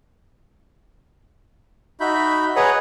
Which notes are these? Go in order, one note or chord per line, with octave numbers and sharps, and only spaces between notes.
D#4 F#4 E5 B5 G6
G#4 B4 C#5 D#5 F#5 A#5